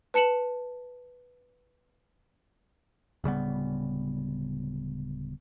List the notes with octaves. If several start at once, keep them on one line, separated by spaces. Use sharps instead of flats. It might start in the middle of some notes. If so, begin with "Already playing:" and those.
B4 A5 C#7 E7 F#7
D1 C#3 G3 B3